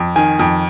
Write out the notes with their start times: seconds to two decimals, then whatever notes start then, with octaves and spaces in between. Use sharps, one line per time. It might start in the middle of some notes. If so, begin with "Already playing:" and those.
Already playing: F2
0.16 D#3 G#5
0.39 F2